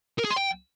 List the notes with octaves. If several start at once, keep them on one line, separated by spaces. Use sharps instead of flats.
A#4
G#4
C6
G5